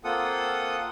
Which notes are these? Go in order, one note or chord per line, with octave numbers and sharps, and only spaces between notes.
A#3 C4 F4 A4 F#5 D#6